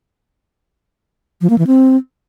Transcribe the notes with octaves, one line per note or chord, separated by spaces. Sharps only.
F3
A#3
E3
C4